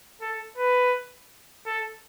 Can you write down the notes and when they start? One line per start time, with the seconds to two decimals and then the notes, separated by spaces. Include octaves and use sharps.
0.21 A4
0.58 B4
1.66 A4